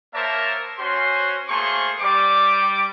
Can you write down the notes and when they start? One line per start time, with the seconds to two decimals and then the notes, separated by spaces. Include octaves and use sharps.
0.14 A#3 A#4 C5 C#5 E5 A5
0.78 C#4 F#4 C5 C6
1.49 A3 A#3 G#4 C5 C6 C#6
2.00 G3 D6